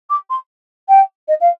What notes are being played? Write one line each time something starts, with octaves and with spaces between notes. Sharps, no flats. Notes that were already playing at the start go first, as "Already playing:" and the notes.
D6
C6
G5
D#5
F5